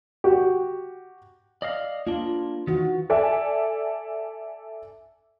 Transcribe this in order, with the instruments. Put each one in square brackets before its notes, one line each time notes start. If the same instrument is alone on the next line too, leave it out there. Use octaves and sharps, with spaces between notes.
[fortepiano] F#4 G4
[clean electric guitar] D5 D#5 F5
[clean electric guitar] A#3 D4 [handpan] F4
[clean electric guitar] D#3 [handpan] E3 F#4
[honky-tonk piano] A4 D5 E5 G#5